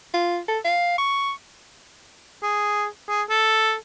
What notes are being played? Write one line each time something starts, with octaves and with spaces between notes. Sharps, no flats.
F4
A4
F5
C#6
G#4
G#4
A4